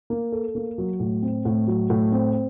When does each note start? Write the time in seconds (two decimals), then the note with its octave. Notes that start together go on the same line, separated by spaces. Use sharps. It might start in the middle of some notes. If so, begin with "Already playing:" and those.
0.10 A#3
0.32 A4
0.55 A#3
0.78 F#3
1.00 A2
1.22 C4
1.45 A2
1.67 F#3
1.90 A2
2.12 C4